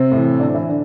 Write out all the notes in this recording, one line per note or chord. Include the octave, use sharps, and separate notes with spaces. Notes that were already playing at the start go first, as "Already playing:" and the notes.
Already playing: C3 C4
A2 E3
D3 D4
E3 E4
D3 D4